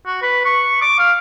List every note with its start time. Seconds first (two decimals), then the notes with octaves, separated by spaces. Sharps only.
0.06 F#4
0.22 B4
0.45 C#6
0.82 D6
0.99 F5